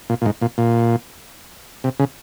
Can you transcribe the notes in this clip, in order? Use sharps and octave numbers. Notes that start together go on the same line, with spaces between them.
A#2
A#2
G#2
A#2
A#2
C3
C#3